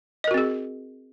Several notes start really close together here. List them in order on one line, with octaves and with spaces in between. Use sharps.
D#5 A#4 F#4 C4 G#4